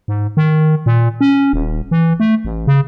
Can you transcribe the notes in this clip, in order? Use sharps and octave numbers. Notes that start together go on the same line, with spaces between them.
G#2
D#3
A#2
C#4
D#1
E3
A3
A1
C#3